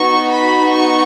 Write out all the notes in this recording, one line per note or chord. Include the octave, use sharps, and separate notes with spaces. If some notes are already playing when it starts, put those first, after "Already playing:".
Already playing: B3 D#4 F#4 C#6
B5
C#6